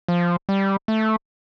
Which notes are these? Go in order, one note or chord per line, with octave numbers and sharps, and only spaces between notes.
F3
G3
A3